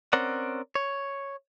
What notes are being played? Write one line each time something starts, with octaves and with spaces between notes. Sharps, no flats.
C4 C#4 A#4 D5 F#5
C#5